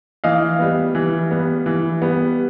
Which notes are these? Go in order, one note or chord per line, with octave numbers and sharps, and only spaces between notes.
E3 D#5 F5
G3 B3
E3
G3 B3
E3
G3 B3